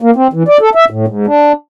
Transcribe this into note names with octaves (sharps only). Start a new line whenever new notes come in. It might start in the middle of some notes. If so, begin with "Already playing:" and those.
A#3
C4
E3
D5
A4
E5
A2
G#2
D4